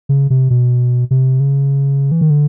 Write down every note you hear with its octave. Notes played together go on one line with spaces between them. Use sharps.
C#3
C3
B2
C3
C#3
E3
D#3
D3